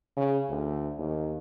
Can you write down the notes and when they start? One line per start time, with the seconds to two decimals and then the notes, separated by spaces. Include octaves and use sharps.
0.17 C#3
0.49 D2
0.98 D#2